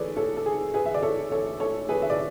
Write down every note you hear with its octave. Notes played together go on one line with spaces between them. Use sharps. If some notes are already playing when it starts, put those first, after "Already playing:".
Already playing: G#4 A4 B4 C#5 D5
A4 C#5
A4
G#4
G#4 B4
E5
D5
A4 C#5
A4 C#5
A4 C#5
G#4 B4
E5
D5